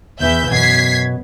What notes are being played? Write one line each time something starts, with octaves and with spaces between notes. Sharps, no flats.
E2 E3 E5 G6
F#2 B2 G#6 B6 C7